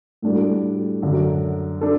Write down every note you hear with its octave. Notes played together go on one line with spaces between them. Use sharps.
A2 G3 D4 F#4 A4
F#2 D3 F#3
D4 A4